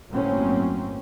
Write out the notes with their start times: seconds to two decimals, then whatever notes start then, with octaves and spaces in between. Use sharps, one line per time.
0.11 G1 A2 F#3 A#3 C4 C#4